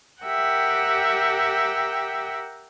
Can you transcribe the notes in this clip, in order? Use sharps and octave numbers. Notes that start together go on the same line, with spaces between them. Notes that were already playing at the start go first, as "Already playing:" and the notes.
G4 A#4 E5 F#5 G5